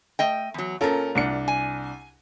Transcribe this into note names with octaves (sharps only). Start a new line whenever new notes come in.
A3 D#5 G5
E2 F#3
A#2 C#4 F4 A4 A#4
C2 D4 C#7
G#5